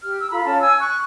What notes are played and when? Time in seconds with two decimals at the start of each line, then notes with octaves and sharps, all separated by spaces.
0.03 G4 F6
0.19 E6
0.31 F4 A4 A#5 B5
0.44 C#4 F4 A5
0.60 G#5 E6
0.79 C#6 F#6